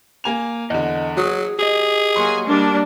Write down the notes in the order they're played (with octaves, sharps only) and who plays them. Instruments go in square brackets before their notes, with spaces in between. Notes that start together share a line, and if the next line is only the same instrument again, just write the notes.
[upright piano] A#3 G#5 F7
[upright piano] E2 D3 [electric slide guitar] D#5
[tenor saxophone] F#3 [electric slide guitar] F#4 G#4 C#5 [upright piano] D#6
[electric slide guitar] G4 D#5 [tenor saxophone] G#4
[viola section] F#3 A#3 G#5 [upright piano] C6 C#6
[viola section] G3 A#3 D4